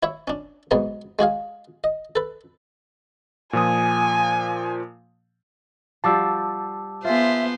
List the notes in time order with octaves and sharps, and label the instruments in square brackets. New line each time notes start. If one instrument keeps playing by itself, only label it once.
[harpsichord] E4 C#5 E5
C#4 D4
B1 G#2 B3 C#5 D#5 A#5
G#3 F#4 G#4 F5
D#5
A4 B4
[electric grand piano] A#2 F3 D#6 [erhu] G#5
[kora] F3 G3 F#4 [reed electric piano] A5 D6 E6
[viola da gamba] B3 C5 [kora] F4 G#4 [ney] E5